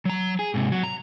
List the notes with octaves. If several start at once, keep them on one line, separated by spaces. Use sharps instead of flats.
F#3 A#5
G#4
G#2 C3
F#3
A#5